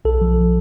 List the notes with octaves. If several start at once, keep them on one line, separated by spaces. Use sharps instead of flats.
B1 A4
F3